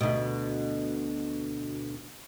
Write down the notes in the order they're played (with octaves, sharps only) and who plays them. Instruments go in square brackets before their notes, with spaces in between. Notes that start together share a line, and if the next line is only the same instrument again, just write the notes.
[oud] D2 B2